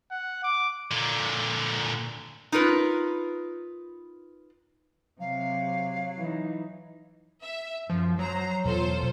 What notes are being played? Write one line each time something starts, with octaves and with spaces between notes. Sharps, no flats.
F#5
D6
A#2 D3
D#4 F4 A#4 B4
C3 F#3 F5
E3 D#4
E5
F#2 F3
F#3 C5 A#5
E2 B2 F4 A4 C5